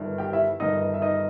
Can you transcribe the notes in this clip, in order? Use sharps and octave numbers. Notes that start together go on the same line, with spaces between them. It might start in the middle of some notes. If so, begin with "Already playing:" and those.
Already playing: G1 G2 D#3
G4 G5
E4 E5
G1 G2 D#3 D#4 D#5
E5
D#4 D#5